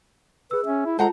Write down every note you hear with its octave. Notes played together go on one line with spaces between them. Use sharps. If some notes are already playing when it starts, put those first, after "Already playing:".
G#4 B4 E6
C#4 E5
E4
G#3 F4 A4 C5 F#5 A5 A#5